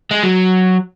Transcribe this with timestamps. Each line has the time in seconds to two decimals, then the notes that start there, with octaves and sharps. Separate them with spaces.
0.11 G#3
0.23 F#3